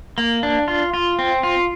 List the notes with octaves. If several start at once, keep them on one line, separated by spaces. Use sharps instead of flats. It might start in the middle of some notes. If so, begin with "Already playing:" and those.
A#3
D4
F4
F4
C4
F4